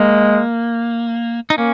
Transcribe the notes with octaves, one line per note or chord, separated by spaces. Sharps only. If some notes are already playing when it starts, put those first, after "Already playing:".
Already playing: G#3 A#3
D#4
A#3 C#4